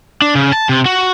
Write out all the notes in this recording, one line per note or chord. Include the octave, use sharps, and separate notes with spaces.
D4
C#3
A5
C3
F#4